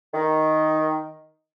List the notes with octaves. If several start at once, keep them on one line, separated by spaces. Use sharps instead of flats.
D#3